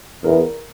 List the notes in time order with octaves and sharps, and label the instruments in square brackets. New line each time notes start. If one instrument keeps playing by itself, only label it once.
[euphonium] E2 [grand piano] A#4